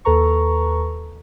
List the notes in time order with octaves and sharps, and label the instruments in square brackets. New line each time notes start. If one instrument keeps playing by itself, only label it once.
[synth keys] D#2 A4 B4 A#5 C#6